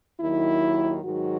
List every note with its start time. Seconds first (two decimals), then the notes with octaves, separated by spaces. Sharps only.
0.20 D#2 D#3 F#3 E4
1.03 G#2 D#3 F#3 F#4